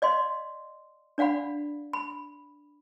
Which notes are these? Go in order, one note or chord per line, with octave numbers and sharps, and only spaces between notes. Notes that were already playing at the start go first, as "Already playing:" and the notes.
D5 D#5 F5 C6
D4 D5 F5 F#5 B5
B5